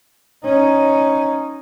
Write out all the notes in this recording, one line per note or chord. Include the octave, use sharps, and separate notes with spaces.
C#4 D#4